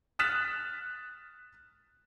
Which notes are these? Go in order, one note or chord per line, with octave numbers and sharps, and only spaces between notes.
D#6 F6 F#6 A6 B6 E7